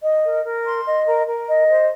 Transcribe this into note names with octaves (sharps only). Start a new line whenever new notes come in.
D#5
A#4
A#4
C6
D#5
A#4
A#4
D#5
C5